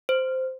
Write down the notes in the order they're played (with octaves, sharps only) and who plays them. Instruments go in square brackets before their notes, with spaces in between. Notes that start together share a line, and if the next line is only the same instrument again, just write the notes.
[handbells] C5